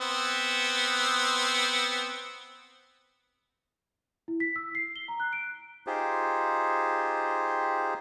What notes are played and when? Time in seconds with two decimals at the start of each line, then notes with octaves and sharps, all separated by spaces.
0.01 B3 C4
4.28 E4
4.40 B6
4.56 E6
4.75 C7
4.96 G7
5.08 A#5
5.20 F#6
5.33 D7
5.87 D#4 F4 G4 G#4 C5